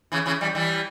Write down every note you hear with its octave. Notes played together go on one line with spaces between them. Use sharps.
C#3 E3
C#3 E3
E3 G3
E3 G3